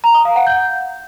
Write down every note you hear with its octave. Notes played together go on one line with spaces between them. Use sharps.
A#5
D#6
F5
F#5
G6